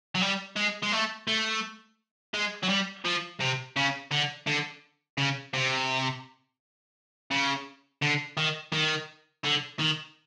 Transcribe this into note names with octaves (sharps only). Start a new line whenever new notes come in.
F#3
G3
G#3
G#3
A3
A3
G#3
F#3
G3
F3
C3
C#3
D3
D3
C#3
C3
C#3
D3
D#3
D#3
D3
D#3